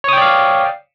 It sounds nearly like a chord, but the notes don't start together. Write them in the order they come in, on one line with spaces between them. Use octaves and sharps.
C#5 D#6 G5 D5 F5